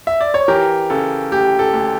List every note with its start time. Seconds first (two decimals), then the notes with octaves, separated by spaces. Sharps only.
0.07 E5
0.21 D5
0.34 C#5
0.48 E3 G4 A#4
0.90 C#3 A4
1.31 D2 G4
1.59 A4
1.74 D2